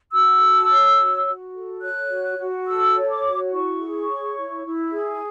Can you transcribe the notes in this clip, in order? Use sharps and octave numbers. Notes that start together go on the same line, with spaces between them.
F#4 E6
A4
C#5
F#4
F#4
A4
C#5 F#6
F#4
F#4
A4 E6
C#5
D6
F#4
E4 C#6
G#4
C#5
E4
E4
G#4